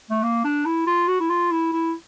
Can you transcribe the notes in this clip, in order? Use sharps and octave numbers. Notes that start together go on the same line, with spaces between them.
A3
A#3
D4
E4
F4
F#4
E4
F4
E4
E4